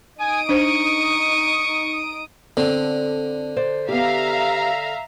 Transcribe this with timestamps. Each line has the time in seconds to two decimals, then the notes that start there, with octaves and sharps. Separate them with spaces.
0.20 D#4 G#5 D#6 D7
0.49 D4 C5 C#6
2.57 D3 C4
3.56 C5 D5
3.88 B3 G4 E5 F5 A#5